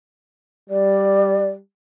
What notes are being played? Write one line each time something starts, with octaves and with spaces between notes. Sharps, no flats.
G3 D5